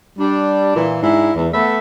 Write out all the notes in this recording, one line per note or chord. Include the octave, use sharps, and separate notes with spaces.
G3 D4
A#2 E3
G#2 D4 E4
E2
A3 B3 B4 E5